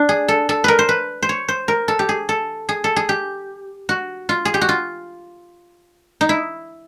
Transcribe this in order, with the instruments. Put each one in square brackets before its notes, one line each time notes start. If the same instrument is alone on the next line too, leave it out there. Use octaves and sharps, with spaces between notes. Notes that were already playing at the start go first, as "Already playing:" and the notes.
Already playing: [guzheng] D4
G#4
A4
A4
A#4 B4
C5
B4
C5
C#5
C5
A#4
A4
G4
G#4
A4
G#4
A4
G#4
G4
F#4
F4
G#4
G4
F#4
F4
D#4
E4